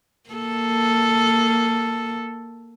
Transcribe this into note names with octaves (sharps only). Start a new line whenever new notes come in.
A#3 A4